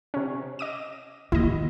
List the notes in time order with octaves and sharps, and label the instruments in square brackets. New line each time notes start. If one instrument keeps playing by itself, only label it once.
[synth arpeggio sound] C3 C#4
D#5 D6 D#7
[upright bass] D#2 [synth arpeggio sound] E4 D#5